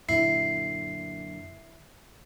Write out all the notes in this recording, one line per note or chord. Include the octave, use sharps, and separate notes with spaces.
F#2 A#2 D3 E4 C7